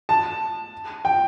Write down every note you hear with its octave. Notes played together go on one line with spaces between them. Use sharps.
A5
G5